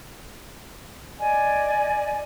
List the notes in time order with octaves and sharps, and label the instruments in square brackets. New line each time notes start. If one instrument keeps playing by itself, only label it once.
[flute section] D5 D#5 G#5